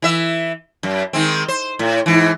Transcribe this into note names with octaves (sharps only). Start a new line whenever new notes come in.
E3 E5
F#2
D#3 G#3 C4
C5
A2
G#2 E3